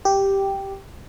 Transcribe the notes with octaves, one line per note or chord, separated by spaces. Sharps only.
G4